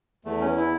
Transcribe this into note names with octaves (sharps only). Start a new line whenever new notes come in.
E2 A3
C#4
E3
E4